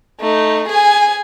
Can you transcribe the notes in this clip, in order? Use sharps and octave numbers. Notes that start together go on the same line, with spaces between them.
A3 D#4
G#4 G#5